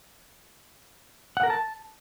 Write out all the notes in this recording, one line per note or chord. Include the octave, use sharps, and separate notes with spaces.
F#5
A#4
A5